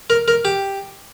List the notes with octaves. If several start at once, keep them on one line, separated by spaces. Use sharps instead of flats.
A#4
A#4
G4